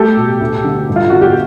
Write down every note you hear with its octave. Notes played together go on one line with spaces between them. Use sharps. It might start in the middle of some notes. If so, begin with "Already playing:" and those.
Already playing: A3 G4 A4
B2
D2
D3
G2
F4
D3 F#4
G4